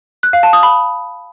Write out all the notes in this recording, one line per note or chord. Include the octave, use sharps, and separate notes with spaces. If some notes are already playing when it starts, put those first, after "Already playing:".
F#6
F5
A5
D#6
B5